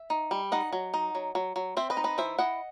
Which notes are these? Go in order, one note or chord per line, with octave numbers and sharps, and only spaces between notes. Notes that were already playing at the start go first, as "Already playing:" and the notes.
Already playing: E5
D#4
G3
D#4 D#5 F#5
F#3
D#4
F#3
F#3
F#3
C4 C5 E5
B4 D#5
D#4
B4 D#5
E3 C5 E5
E4 D#5 F#5